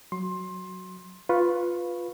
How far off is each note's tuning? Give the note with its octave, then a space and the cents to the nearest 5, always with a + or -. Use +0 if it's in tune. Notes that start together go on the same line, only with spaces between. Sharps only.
F#3 +0 C6 +20
F4 +10 B4 +0 C#6 -15